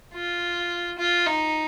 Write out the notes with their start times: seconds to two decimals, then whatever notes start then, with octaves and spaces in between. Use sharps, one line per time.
0.14 F4
0.99 F4
1.26 D#4